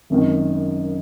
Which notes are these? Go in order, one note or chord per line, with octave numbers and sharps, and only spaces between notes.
G#1 F#2 D#3